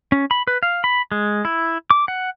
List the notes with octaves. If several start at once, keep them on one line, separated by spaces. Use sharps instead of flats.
C#4
B5
B4
F5
B5
G#3
E4
D6
F#5